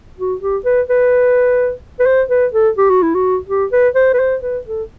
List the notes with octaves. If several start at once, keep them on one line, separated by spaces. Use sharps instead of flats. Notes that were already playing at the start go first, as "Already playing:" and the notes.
F#4
G4
B4
B4
B4
C5
B4
A4
G4
F#4
E4
F#4
G4
B4
C5
B4
C5
B4
A4